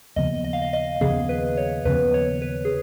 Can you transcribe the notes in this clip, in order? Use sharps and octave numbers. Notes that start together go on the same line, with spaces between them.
D#2 C#3 F3 B3 D#5
D#5
F5
D#5
D#5
D#2 C#3 F3 B3 G#4
B4
C#5
D#2 C#3 F3 B3 B4
C#5
B4
G#4